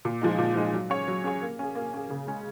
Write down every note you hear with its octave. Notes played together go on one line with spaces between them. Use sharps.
A#2
F3 G#3 D#4
A#2
F3 G#3 D#4
F#3
C#4 G#4 C#5
F#3
C#4 G#4 C#5
A#3
C#4 G#4
A#3
C#4 G#4
C#3
G#3 C#4